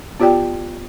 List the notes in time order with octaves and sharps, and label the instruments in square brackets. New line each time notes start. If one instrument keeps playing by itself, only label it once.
[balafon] B3 F4 G4 D5 G5